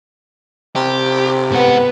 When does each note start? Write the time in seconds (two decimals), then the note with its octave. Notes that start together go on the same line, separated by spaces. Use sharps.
0.76 C3 G4
1.51 G#2 B3 B4 F#5